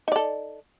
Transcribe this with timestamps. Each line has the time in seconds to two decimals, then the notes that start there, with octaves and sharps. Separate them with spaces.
0.08 D#4
0.12 D5
0.16 A4